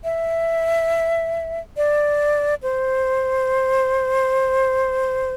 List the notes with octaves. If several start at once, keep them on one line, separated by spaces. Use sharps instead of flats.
E5
D5
C5